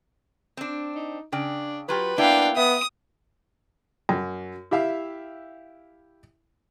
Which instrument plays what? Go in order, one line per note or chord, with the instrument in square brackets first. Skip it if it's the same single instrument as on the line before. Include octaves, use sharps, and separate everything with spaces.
[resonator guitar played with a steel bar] C4 D4
[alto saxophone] D#4
[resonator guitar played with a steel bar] C#3 G5 [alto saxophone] D4
[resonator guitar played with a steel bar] F#3 F4 G4 [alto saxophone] B4
[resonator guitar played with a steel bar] A#3 B3 E4 [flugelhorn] D4 [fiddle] F5 G5
[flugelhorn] B3 [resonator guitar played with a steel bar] E5 [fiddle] D#6
[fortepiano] F#2
E4 G4 E5 F5